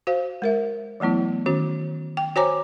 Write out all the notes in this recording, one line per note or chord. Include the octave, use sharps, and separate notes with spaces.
F#4 C5 F5
G#3 A#4 E5
E3 F#3 A3 B3 E4
D#3 C#4 F#4
G5
F#4 C5 C#5 G#5 A#5 D6